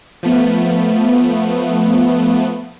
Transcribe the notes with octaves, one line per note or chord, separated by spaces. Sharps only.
F3 A3 B3